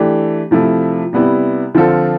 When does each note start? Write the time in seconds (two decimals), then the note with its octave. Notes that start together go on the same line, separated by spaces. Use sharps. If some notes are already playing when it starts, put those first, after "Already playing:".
Already playing: E3 A3 D4 G4
0.51 C3 F3 A3 E4
1.13 C3 G3 B3 E4
1.74 D3 F3 C4 F4 A4